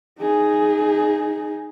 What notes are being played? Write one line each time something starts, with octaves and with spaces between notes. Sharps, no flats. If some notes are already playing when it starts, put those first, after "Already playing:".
D#4 G#4